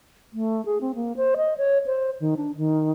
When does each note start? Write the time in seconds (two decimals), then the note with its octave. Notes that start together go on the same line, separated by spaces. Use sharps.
0.33 A3
0.66 G#4
0.81 C4
0.95 A#3
1.17 C5
1.37 D#5
1.57 C#5
1.86 C5
2.20 D#3
2.37 D4
2.57 D#3